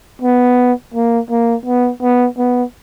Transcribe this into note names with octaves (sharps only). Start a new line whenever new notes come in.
B3
A#3
A#3
B3
B3
B3